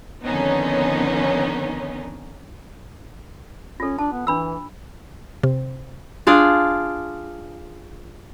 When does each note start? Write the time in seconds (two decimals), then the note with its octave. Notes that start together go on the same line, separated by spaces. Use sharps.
0.24 F2 D3 D#3 B3 C#4 D#4
3.80 C#4 F4 A4
3.99 D4 A5
4.12 B3
4.27 E3 D4 B5 E6
5.43 C3
6.27 D4 F4 G#4 D5